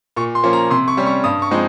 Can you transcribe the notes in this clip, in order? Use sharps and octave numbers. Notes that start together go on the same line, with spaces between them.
A#2 C#6
C6
F3 A#3 C#4
A#5
C3 C6
C#6
G3 C#4
C#6
G2 D#6
C#6
F3 G#3 C4 D#4